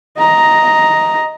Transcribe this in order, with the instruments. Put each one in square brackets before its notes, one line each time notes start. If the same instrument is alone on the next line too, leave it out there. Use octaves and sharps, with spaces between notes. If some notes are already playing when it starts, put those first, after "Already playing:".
[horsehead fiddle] D#5 A#5